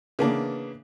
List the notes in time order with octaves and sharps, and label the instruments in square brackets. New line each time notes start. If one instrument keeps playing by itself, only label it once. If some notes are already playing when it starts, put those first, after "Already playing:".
[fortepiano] C#3 E3 A#3 B3 D4